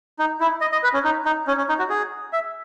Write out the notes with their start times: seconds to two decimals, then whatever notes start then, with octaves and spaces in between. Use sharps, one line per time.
0.19 D#4
0.40 E4
0.61 D#5
0.72 D#5
0.83 B4
0.94 C#4
1.04 D#4
1.25 D#4
1.47 C#4
1.57 C#4
1.69 D#4
1.79 F#4
1.90 G#4
2.33 E5